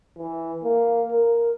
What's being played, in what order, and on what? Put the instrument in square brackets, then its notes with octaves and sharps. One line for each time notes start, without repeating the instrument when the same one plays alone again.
[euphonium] E3
A#3
A#4